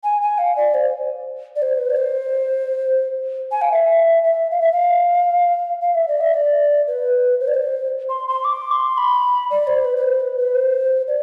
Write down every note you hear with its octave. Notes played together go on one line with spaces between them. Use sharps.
G#5
G#5
F5
D5
C5
D5
C5
B4
D5
C5
G#5
F5
E5
E5
F5
E5
F5
F5
E5
D5
E5
D5
B4
C5
D5
C5
C6
C6
D6
C6
B5
D5
C5
B4
B4
C5
B4
B4
C5
D5